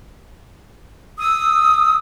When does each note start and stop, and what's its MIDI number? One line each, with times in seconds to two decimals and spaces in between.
1.19 1.96 87
1.19 1.96 88